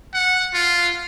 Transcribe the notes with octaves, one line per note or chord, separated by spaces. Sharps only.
F#5
F4